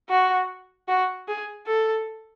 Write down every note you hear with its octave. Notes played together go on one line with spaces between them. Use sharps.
F#4
F#4
G#4
A4